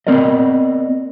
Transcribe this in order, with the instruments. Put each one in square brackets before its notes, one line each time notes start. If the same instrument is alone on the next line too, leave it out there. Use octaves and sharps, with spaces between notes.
[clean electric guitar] B3 C4 A#4 D5 D#5